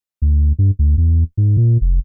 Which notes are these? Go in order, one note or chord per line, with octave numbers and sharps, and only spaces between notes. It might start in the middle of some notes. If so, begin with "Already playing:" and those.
D2
G2
D2
E2
G#2
A#2
F1